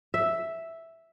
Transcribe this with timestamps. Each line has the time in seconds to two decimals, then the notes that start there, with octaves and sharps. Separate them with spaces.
0.14 E5